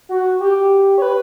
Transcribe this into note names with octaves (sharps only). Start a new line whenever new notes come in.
F#4
G4
C#5
B4